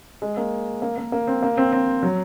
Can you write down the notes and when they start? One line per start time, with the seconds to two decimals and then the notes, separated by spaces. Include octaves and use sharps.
0.22 G#3
0.37 A#3
0.82 A#3
0.97 A#3
1.12 A#3
1.27 C4
1.43 A#3
1.57 C4
1.72 C4
2.03 F#3